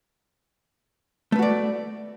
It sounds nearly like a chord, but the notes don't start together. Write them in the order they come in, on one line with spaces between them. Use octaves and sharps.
A3 B4 F#4 D5